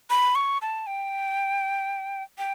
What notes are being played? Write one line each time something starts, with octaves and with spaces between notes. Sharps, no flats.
B5
C#6
A5
G5
G5